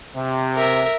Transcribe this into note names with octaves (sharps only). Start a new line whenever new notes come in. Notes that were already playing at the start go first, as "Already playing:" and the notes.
C3
A#4 E5